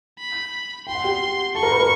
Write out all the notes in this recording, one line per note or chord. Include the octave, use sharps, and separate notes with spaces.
B5
G5 C6
F#5
G4 G5
A4 A5 C#6
A#4 A#5
B4 B5
A#4 A#5